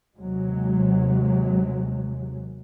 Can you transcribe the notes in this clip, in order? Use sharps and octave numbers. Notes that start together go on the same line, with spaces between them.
D#2 C3 F#3 G#3